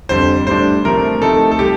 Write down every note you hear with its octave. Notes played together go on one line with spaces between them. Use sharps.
F2 D3 G3 C5
A2 G3 D4 C5
C3 F3 A3 A#4
C3 F3 A3 C4 D#4 A4
A4
C3 G3 G4